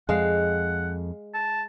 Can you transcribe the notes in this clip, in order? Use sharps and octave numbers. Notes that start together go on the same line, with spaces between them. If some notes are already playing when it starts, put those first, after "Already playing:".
F2 G#3 F5 F#5
A5